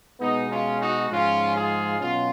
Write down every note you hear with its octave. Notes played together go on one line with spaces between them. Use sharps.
B2 G#3 B3 D#4
C#4 F4
D#4 F#4
G#2 F3 G#3 C#4 F4
F4 G#4
B2 F#3 C#4 F4